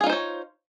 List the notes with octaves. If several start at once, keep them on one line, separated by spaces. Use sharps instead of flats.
D#4 F4 G#4 C5 C#5